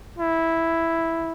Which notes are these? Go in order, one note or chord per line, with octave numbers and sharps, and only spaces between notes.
E4